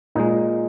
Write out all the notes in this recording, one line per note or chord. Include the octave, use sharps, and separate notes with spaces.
A#2 G#3 D#4